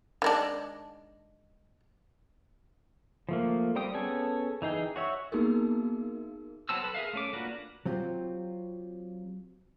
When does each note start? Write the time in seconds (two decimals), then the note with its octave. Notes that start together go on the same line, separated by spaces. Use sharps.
0.22 D#3 G#3 D4
3.29 F3 A3 A#3
3.75 G3 C4 G4 G5 D#6
3.93 B3 C#4 G#4 A4 G#5
4.62 E3 D#4 G#4 G5
4.96 F#4 C#5 E5
5.32 A#3 B3 D#4 F#4 G#4 A#4
6.69 F#3 B3 C4 A5 E6
6.82 A4 B4
6.94 G#4 A#4 E5 F5
7.13 A3 C#4 D6
7.33 A#3 D4 F4 F#4 B4
7.86 F#3 C4 F4 G4